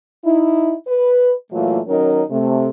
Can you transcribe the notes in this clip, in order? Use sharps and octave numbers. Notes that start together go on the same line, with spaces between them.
D#4 E4
B4
A#2 E3 F#3 A3 A#3 F4
D#3 F#3 C#4 D#4 A#4
C3 A3